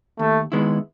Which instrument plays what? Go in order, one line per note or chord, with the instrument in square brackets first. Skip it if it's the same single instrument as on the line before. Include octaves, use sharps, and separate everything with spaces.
[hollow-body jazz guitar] D#2 [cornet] A3
[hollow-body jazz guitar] D#3 G#3 B3 E4